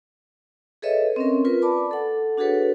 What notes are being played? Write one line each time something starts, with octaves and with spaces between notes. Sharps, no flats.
G#4 A4 B4 C#5 D#5 E5
C4 C#4 A#4
F4 A#4 B4
D5 A5 B5 D6
A4 F#5
D4 F#4 G#4 A4 B4 C#5